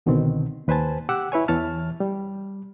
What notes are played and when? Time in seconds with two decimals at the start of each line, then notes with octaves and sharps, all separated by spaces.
0.06 C2 B2 D3 D#3 C4
0.68 D#2 B4 C5 G#5 A5
1.09 G4 F#5 D6 E6 F#6
1.32 E4 B4 C#5 G#5
1.48 E2 E3 C#5 A5 F6
2.00 G3